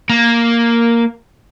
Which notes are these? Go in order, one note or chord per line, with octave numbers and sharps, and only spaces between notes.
A#3